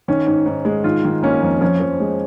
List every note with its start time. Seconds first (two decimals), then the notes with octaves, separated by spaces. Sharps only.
0.08 D#3 C#4
0.27 G#2
0.46 G#2
0.65 G#3
0.84 D#3 F4
1.05 D#3
1.23 A#3 C#4
1.42 F2
1.61 F3 C#4
1.80 F3
2.00 G#3